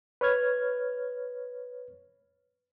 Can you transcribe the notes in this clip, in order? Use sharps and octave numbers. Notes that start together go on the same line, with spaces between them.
B4 C#5 F6 G#6